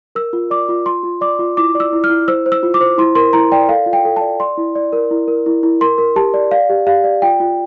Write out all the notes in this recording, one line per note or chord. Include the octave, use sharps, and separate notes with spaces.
A#4 E6
F4
D5 D6
F4
F4 C6
F4
D5 D6
F4
E4 D6
D5
E6
E4
F6
E4
C5 E6
C5
E6
F4
D6
C5
E4 C6
A#4 C6
E4 A#5
D5 G5
A4 F5
F4
G5
A4
D5 A5
D5 C6
E4
D5
A#4
E4
A#4
E4
E4
A#4 C6
A#4
G4 A5
D5
D5 F5
G4
G4 F5
D5
F4 G5
F4